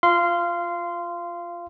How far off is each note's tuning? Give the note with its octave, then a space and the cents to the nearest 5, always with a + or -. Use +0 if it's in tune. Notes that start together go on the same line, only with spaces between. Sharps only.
F4 +0 F5 -20 C6 -15